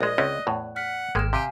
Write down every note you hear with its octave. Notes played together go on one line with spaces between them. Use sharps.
A#1 G#3 D5 D#5
C#2 C4 C#4 F#6
E2 A2
F#5 F6 B6
G#1 G#3 A#3 G5 F6 E7
C3 G4 F5 G#5